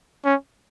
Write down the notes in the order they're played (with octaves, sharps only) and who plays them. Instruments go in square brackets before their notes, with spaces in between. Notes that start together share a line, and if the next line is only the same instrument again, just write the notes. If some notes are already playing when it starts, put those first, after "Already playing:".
[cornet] C#4